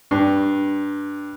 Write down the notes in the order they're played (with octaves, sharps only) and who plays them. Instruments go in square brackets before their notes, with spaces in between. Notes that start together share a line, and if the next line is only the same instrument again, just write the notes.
[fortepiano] G2